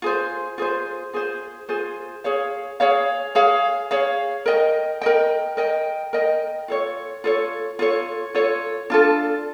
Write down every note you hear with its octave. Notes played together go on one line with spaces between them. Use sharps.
F4 G#4 C5
F4 G#4 C5
F4 G#4 C5
F4 G#4 C5
G#4 C#5 F5
G#4 C#5 F5
G#4 C#5 F5
G#4 C#5 F5
A#4 D#5 G5
A#4 D#5 G5
A#4 D#5 G5
A#4 D#5 G5
F4 A4 C#5
F4 A4 C#5
F4 A4 C#5
F4 A4 C#5
D4 F4 A4